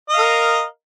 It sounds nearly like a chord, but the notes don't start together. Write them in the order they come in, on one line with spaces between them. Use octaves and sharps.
D#5 F5 A#4